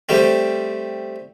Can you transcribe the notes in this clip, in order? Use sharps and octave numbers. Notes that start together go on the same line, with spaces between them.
G3 A3 C4